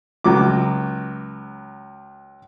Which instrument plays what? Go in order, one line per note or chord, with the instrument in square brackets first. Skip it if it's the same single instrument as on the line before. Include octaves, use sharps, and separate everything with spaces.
[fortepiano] C#2 F#3 D6